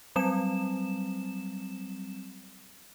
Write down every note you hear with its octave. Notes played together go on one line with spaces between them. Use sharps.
F#3 G3 C4 E7